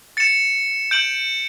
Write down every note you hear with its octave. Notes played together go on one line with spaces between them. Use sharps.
A6 C#7 E7
G6 D7 F#7